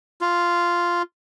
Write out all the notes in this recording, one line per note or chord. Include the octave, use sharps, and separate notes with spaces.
F4